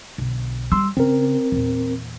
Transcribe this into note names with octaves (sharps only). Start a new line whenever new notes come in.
B1 D3
G3 C6 E6
C#3 C4 A#4
E2 A#2